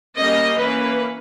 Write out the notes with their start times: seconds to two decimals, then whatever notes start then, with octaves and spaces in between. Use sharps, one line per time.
0.16 G3 A#3 C#4 D#5
0.58 E3 A#3 C#4 B4